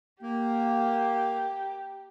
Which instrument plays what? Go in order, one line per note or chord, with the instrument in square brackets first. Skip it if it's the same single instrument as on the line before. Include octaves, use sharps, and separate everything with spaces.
[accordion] A#3 [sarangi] G4